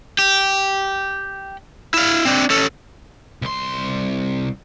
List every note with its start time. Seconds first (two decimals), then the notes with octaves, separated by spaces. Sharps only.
0.19 G4
1.94 E4 F5
2.25 C4 D4
2.50 C#4 A4
3.42 C2 C6